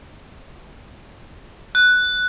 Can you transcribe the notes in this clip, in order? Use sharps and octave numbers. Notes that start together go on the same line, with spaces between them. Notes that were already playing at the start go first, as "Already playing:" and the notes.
F#6